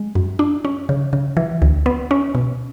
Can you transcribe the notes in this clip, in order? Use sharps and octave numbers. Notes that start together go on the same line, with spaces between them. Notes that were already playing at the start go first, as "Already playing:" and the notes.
Already playing: G#3
F#2
D4
C#4
C#3
C#3
E3
D2
B3
C#4
B2